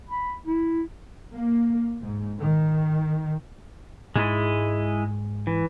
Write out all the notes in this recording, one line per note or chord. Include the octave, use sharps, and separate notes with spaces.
B5
E4
A#3
G#2
D#3
G#2 G#3 E4 D#5
E3